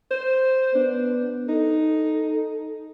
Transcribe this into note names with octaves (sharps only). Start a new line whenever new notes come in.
C5
B3 D4
D#4 A4